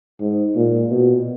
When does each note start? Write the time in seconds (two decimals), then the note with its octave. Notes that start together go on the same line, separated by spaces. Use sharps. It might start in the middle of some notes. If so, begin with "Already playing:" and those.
0.20 G#2
0.56 A#2
0.91 B2